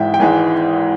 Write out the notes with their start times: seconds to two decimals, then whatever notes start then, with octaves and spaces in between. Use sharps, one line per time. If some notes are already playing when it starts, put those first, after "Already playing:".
Already playing: G#1 G#2 E3 G#3 E5 G5
0.14 G5
0.19 G#1 G#2 E3 G#3 G#5